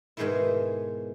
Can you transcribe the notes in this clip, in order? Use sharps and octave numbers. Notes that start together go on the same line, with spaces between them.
G#2 B2 D#3 G#3 A3 E4